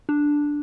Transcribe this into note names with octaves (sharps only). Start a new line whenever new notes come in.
D4